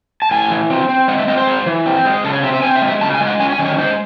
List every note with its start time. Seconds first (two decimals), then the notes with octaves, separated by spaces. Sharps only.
0.22 A5
0.31 A2 G#5
0.51 E3
0.70 C4
0.89 C4
1.08 G#3 F#5
1.18 E5
1.28 C4 D#5
1.37 C5
1.47 G#3
1.66 E3
1.86 C4
2.05 G#3
2.24 C#3 A4
2.33 C#5
2.43 C4 E5
2.54 E5
2.62 C4 G#5
2.76 E5
2.82 G#3
2.88 E5
3.01 C#3 A5
3.14 G#5
3.21 G#3
3.27 F#5
3.40 C#4 G#5
3.52 G#5
3.59 D#3
3.66 C#5
3.78 G#3 C5